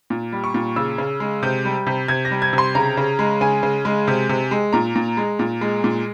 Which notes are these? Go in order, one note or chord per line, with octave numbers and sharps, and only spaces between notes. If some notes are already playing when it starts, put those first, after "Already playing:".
A#2
G3
C#6
A#2
C#3 E6
C#3
G#3
C3 G6
G3
C3
C3 G#6
A#6
G3
G#6
C3
C6
C#3 A#5
C#3
G#3
C#3 G#5
C#3
G#3
C3
C3
G#3
A#2 A#5
A#2
G#3
A#2
G#3
A#2